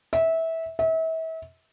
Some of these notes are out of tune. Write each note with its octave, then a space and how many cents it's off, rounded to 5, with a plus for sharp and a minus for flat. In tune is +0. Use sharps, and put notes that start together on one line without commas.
E5 -20
E5 -35